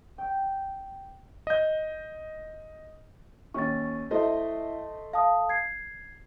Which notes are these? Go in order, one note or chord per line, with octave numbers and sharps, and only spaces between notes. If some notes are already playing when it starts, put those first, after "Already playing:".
G5
D#5 G6
D#2 C#4 C#6 A6
A3 E4 C5 D#5 E5
F5 A5 D#6
G#6 C7